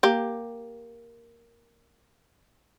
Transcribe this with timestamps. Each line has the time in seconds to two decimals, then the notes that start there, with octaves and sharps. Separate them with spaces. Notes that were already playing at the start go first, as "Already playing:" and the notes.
0.03 A#3 G4